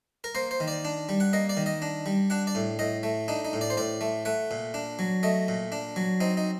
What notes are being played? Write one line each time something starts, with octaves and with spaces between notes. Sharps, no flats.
A#4
A#3 C5
C5
D#3
D5
D4
G3
F#5
A#3 D#5
D5
D#3
D#5
D4
G3
D4 F#5
D5
A2
A2 D#5
A3
D4 D#4
D#4
A2
D5
C5
A2 D5
A3
A3 F#5
A#2
D4
F#3
A3 D#5
A#2
D4
F#3
C4 D#4
D#4